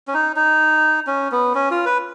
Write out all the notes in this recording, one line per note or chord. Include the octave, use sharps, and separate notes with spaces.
C#4
D#4
D#4
C#4
B3
C#4
F4
B4